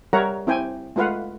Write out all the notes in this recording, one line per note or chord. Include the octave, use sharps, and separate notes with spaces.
G3 A#4 C#5 E5 F#5 A#5
C4 E4 C5 G5 G#5
G#3 A3 F4 B4 F5 F#5